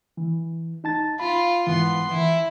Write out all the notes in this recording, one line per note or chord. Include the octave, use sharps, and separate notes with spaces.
E3
D#4 A5 A6
F4 B5
G#2 E3 B3 C6
E3 E4